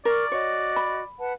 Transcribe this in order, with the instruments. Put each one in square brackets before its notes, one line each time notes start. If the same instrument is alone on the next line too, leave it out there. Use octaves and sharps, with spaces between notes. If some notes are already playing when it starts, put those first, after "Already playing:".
[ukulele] A#4 [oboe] D5 [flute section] C#6 F6
[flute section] F#4 D#5 [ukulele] C#5
[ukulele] B5
[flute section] B4 F#5 A5